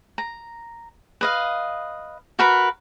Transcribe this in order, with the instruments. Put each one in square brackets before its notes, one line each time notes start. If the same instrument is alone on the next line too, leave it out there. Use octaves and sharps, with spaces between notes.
[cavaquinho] A#5
B4 D#5 F5
F#4 A#4 B4 B5